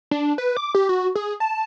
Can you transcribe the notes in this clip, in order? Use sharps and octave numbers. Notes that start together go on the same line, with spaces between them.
D4
B4
D6
G4
F#4
G#4
A5